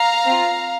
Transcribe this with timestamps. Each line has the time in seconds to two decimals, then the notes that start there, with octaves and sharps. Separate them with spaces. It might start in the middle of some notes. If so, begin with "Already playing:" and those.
Already playing: F5 A#5
0.25 C4 F4